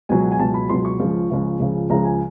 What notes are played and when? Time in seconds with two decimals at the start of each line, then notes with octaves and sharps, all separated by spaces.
0.09 C#2 B2 F#3 G#5
0.32 G#5
0.39 C#2 B2 F#3 A5
0.54 B5
0.69 C#2 B2 F#3 C6
0.85 C#6
1.00 C#2 C#3 F3
1.30 C#2 C#3 F3
1.60 C#2 C#3 F3
1.90 C#2 C#3 F3 A#5
2.04 G#5